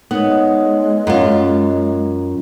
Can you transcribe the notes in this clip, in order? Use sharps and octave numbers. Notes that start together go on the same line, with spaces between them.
G#3 B3 D#4 A#4 C#5
F#2 C#4 F4 A#5